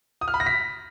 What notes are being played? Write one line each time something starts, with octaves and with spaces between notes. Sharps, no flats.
D#6
F6
B5
A#6
B6